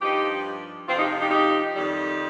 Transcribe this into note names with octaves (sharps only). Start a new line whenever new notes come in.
G2 F3 D#4 G4
F2 C3 F3 C4 F4
D#4 G4
D#4 G4
D#4 G4
F2 D#3 G3